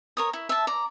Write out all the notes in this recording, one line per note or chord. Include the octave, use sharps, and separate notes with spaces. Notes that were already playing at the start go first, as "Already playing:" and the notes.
A#4 C#5 D#6
E4
E5 A5
D5 A#5